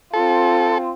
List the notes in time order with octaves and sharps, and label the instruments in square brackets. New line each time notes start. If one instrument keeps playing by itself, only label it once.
[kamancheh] C4 F4 [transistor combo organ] A4